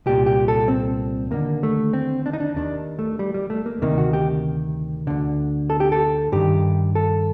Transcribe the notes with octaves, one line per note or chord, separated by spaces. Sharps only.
C2 A#2 G4
G4
A4
C4
D#2 D3 A#3
A3
C4
D4
D#4
D4
D#2 D#3 D4
A3
G3
G3
A3
A#3
D2 C3 D#3 A#3
F#4
G4
D2 D3
A4
G4
A4
G2 D#3 G4
A4